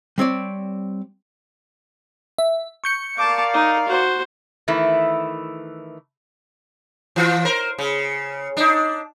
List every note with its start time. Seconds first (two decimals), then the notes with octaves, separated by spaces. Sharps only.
0.18 G3 C4 C#5 D5
2.38 E5
2.84 C#6 G6 C#7
3.17 A#4 D5 F5 A5 D6
3.54 D#4
3.88 F#4 C5
4.68 D#3 E3 A3 E4
7.16 E3 F4
7.45 A#4 C5
7.78 C#3
8.57 D4 D#4